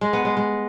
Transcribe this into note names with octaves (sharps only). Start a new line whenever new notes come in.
G#3
B3
G#3
G#3